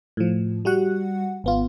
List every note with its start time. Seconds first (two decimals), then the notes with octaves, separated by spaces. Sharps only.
0.17 A2 F3
0.65 G3 F#4 F#5
1.44 G#1 B3 F4